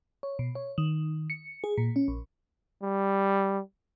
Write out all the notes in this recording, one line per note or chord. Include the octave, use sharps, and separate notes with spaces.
C#5
B2
C#5
D#3
C#7
G#4
A#2
C#4
A#1
G3